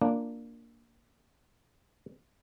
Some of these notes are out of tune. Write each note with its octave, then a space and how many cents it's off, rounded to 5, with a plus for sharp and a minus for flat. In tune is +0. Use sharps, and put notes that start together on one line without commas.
A#3 +0 D4 +0 F4 +0